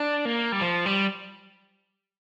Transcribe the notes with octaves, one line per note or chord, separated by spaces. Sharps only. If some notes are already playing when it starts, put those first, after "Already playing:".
Already playing: D4
A#3
G3
F3
G3